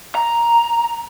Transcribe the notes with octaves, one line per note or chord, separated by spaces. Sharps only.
A#5